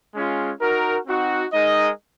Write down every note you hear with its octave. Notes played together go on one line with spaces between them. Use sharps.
G#3 C#4 F4
D#4 F#4 A#4
C4 D#4 F#4
G#3 D#4 A#4 D#5